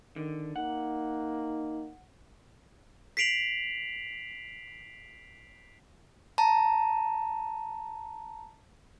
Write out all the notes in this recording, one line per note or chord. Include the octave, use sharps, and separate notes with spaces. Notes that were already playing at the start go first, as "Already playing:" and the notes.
D3 D#3
A#3 D#4 F#5
B6 C7 D7 F7 F#7
A5 A#5